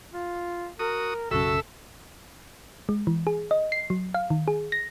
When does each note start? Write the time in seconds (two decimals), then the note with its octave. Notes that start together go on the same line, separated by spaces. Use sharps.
0.13 F4
0.79 F#4 A#4 D#6
1.31 B1 F#2 C#3 F#4 A4 E5 E6
2.89 G#3
3.07 E3
3.27 G#4
3.51 D#5
3.72 C7
3.90 F#3
4.14 F5
4.30 D#3
4.48 G#4
4.72 A#6